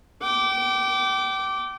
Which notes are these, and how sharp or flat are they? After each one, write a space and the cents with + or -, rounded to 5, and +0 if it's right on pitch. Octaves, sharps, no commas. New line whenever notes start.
G5 -35 D6 -5